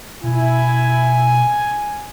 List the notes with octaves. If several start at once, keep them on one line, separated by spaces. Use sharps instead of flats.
B2 E4 G#5